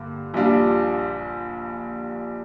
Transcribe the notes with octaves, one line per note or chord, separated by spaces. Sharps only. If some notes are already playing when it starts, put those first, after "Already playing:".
Already playing: G2 D3 A#3
A#1 A#2 G3 D4 F4